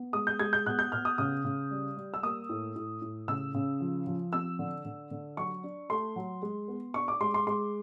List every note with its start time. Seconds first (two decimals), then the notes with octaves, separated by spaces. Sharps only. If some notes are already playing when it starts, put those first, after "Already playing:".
Already playing: B3
0.13 G#3 D#6
0.27 G6
0.39 G#3 G#6
0.53 G6
0.66 B2 F#6
0.79 G6
0.92 B2 F6
1.05 D#6
1.18 C#3 D#6
1.45 C#3
1.71 G3
1.97 G3
2.14 E6
2.23 A#3 D#6
2.49 A2
2.75 A2
3.02 A2
3.28 C#3 E6
3.54 C#3
3.80 F3
4.07 F3
4.33 C4 E6
4.59 D3
4.85 D3
5.11 D3
5.37 F#3 C#6
5.63 D4
5.90 A3 C6
6.16 F#3
6.42 G#3
6.68 B3
6.94 D4 C#6
7.08 D6
7.20 G#3 C6
7.34 C6
7.47 G#3 C6